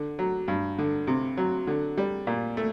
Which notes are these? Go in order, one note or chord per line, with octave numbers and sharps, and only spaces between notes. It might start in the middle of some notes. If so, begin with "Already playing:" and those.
Already playing: D3
F#3
G2
D3
C3
F#3
D3
G3
A#2
A3